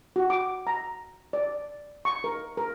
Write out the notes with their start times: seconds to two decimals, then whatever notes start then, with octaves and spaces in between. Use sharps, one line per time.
0.16 F#4
0.30 D6
0.67 A#5
1.33 D5
2.05 C#6
2.24 A#4
2.57 A#4